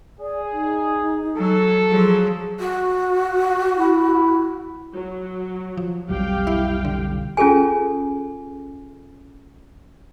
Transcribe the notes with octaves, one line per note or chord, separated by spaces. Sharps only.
G#4 D5
D#4
F#3 A4
F3 F#3 G#4
F#4
E4
F#3
F3
F1 B1 G3 G4 F5 G5
E4
D3
C#4 F4 G#4 A4 G#5